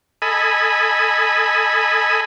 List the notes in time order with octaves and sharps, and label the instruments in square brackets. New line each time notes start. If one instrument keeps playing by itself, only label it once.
[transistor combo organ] A4 D#5 G#5 B5